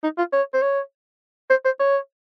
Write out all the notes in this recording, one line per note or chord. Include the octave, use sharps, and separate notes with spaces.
D#4
F4
C#5
C5
C#5
C5
C5
C#5